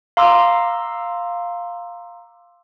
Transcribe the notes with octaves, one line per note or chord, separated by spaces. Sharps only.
F5 A#5 C6 D6 E6